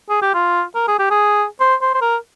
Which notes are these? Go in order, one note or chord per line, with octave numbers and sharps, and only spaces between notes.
G#4
G4
F4
A#4
G#4
G4
G#4
C5
C5
C5
A#4